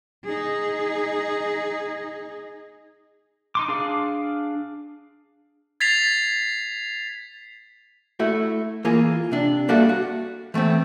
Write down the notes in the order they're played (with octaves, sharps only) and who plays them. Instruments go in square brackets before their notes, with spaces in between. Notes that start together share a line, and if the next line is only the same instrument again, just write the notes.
[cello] D#4 G#4
[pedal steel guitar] D#4 C6 D6
D4 G#4 F5 D6
[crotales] G#6 A6 B6 C7 F7
[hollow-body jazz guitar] A3 E4 F#4
E3 A#3 F4 G#4
C3 D4
G3 A#3 F#4 A4 D5 E5
F#4
E3 A3 B3 C4